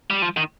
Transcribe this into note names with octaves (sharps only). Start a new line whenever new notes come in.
G3
F3
D#3